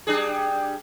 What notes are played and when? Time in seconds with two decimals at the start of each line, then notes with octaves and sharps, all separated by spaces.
0.07 G3 D4 G#4